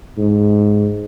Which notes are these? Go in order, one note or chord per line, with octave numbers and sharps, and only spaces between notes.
G#2